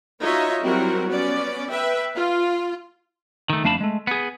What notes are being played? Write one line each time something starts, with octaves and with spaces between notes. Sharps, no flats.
D#4 F4 F#4 C#5 D#5 E5
F#3 G3 C4 E4 F#4 A#4
B3 C#4 D5
B4 E5 G5
F4
D#3 A3
F2 A3 D4 F5 A5 B5
G#3 A3
B3 G#4